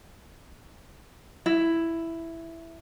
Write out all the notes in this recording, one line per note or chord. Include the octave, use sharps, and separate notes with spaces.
E4